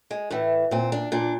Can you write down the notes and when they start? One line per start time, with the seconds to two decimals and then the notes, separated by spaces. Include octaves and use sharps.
0.11 G#3
0.30 A2 E3 A3
0.71 A#2 C4
0.92 D4
1.12 A#2 D4